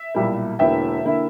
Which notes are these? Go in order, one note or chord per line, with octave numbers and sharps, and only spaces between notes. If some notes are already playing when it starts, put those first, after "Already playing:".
Already playing: E5
B1 A#2 G3 A#3 E4
E1 E2 D3 A#3 E4 E5 G5
D3 A#3 E4